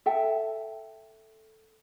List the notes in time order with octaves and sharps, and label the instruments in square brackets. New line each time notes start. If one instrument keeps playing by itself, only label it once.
[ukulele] A4 E5 G5 A5